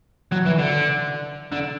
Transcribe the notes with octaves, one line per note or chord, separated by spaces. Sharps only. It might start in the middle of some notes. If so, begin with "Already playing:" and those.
F#3
E3
D3
D3